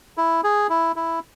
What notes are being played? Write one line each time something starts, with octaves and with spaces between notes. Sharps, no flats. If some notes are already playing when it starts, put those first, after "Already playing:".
E4
G#4
E4
E4